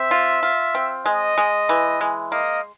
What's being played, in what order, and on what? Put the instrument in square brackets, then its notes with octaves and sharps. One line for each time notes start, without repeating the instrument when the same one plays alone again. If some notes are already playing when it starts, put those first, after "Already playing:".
Already playing: [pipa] C4 [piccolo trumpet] E5
[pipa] F4
F4
C4
[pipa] G#3 [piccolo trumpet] D#5
[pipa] G#3
E3
G#3
[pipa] A#3 [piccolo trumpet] D#5